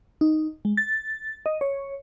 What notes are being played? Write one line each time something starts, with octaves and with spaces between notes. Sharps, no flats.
D#4
G#3
A6
D#5
C#5